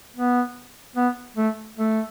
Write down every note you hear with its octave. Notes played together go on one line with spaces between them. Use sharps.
B3
B3
A3
A3